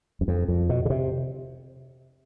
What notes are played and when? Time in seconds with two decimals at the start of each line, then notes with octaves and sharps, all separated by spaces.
0.21 F#2
0.28 F2
0.48 F2
0.69 B2
0.85 C#3
0.90 C3